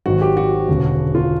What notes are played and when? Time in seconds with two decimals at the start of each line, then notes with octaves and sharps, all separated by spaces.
0.06 G#1 G#2 D#3 F#3 F#4
0.22 G4
0.37 F#4
0.68 E1 D2 C#3
1.15 F4